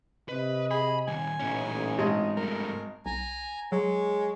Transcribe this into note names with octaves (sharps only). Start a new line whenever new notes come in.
C3 B4 D#5
G#4 B5
D#3 G3 G#5
A1 A#2 C#4 D#4
G#1 G#3 D#5
G2 A3 A#4
B1 G#5 A#5
F#3 G#3 C#5